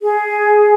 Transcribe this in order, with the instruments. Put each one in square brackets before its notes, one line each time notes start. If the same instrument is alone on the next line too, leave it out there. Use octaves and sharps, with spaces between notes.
[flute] G#4